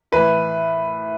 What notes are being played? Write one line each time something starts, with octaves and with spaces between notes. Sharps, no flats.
A2 E3 B4